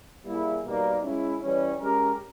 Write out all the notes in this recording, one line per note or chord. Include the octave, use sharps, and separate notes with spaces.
G3 A#3 E4 G#4
B2 G3 A#3 D#4
G#3 C#4 E4
E3 G3 C#4
G#3 C#4 G4 A#4